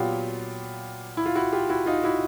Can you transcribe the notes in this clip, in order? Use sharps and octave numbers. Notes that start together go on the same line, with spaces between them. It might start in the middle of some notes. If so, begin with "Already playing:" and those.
Already playing: A#2 F#3 B3 F4 G4
E4
F4
E4 F#4
F4 G4
E4 F#4
D#4 F4
E4 F#4